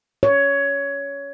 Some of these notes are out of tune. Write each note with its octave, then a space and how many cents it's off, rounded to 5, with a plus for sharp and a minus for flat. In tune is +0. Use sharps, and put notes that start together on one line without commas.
C#5 +15